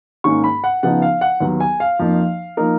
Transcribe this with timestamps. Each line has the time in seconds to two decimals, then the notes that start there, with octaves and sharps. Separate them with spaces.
0.24 G#2 D#3 A#3 C#4 C#6
0.44 B5
0.64 F#5
0.83 C#3 F3 B3 D#4 F#5
1.02 F5
1.21 F#5
1.40 D#2 D#3 F#3 B3
1.60 G#5
1.80 F5
1.99 F2 F3 A#3 D#4
2.57 F3 A#3 D#4 A#4